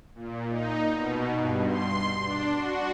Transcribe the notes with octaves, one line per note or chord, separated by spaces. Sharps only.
A#2
D#4
B2
G2
C6
D4
F#4